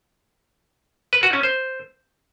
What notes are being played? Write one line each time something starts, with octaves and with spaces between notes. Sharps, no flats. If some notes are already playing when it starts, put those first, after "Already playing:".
B4
F#4
C#4
C5